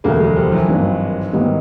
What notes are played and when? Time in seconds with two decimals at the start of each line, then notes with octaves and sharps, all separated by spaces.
0.04 E1 D2 D3 G#3 A#3
0.20 F#3 G#3
0.36 F3 G3
0.52 E3 F#3
0.68 G#1 G2 D#3
1.33 G#2 D#3 G3 B3 D#4